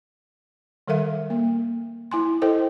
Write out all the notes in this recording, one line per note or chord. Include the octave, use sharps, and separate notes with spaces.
D#3 G3 A4 A#4 E5 F5
A#3
E4 G#5 C6
E4 A4 C5 D#5 G5